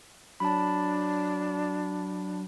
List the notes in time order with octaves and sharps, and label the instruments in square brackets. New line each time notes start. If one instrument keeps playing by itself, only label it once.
[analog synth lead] F#3 [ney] D4 [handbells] A5 B5